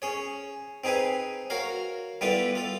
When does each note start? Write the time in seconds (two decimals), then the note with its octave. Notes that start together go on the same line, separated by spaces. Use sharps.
0.02 C#4 G#4 C#5
0.84 C4 D#4 G#4 B4 G#5
1.50 F#4 A#4 C#5 F5
2.21 G3 B3 E4 F4 A4 B4
2.55 F4 A4